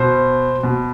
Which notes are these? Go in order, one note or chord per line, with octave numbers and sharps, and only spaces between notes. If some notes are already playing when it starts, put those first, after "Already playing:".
Already playing: B2 C5
B2